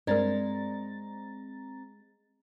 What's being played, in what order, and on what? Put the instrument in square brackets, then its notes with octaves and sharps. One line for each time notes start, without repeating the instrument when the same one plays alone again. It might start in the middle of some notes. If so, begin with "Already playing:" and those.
[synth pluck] G2 A#4 [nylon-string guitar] G#3 [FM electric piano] C4 A#5 A6 [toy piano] D5